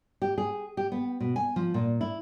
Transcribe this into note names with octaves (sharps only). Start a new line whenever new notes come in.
G4
G#4
G4
B3
B2
G#5
F3
A#2
E4